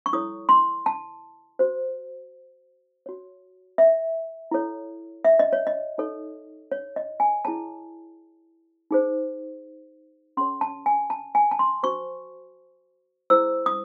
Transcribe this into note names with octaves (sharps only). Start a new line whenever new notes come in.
C#6
E4 A4 C#5 D#6
C6
A5
F#4 C5
F#4 C#5
E5
E4 A4 C#5
E5
D#5
C#5
D#5
D#4 A4 C#5
C#5
D#5
G#5
E4 G#4 C#5 A5
D#4 G#4 C5
C#4 G#4 C#5 C6
A5
G#5
A5
G#5
A5
C6
F#4 C5 C#6
E4 G#4 C5 E6
D#6